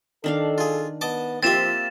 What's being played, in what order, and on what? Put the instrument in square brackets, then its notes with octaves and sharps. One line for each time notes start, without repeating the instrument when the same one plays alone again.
[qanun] D#3 D4 F5 [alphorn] A4
[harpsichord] F4 G#4
[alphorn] B3 [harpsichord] D#5 A5 D6
[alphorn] F3 [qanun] A#3 F4 E5 [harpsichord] C4 G4 [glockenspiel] A6 E7